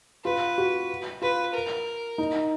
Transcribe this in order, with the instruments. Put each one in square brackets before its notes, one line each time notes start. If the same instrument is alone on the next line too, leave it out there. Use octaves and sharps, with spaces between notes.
[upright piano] F4 [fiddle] B4
[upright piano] F#4
[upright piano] F4 [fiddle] B4
[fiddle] A#4
[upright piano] D#4